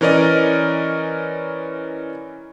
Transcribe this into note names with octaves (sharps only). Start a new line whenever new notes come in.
E3 C#4 A#4 D5 D#5